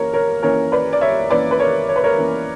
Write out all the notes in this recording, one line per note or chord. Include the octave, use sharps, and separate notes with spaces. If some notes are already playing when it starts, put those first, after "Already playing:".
Already playing: E3 A#3 C#4 A#4 C#5
A#4 C#5
E3 A#3 C#4 A#4 C#5
B4 D5
D5
C#5 E5
E3 A#3 C#4 B4 D5
B4
A#4 C#5
C#5
B4
A#4 C#5
E3 A#3 C#4